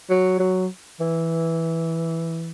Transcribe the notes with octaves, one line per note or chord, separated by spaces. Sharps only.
F#3
F#3
E3